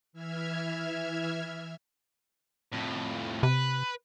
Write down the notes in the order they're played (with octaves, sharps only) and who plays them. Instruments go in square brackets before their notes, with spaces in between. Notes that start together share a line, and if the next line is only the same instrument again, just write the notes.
[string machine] E3 E5 F6 G#6
[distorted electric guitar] F2 A2
[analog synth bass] C3 [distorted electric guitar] B4